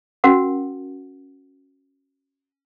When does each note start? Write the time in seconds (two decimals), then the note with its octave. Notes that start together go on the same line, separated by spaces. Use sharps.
0.24 C#4 F#4 A#4 F#5